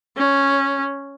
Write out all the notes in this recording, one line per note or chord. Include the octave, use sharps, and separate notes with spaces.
C#4